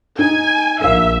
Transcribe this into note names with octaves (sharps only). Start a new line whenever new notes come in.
D#4 G#5
A#1 A#4 E5 F5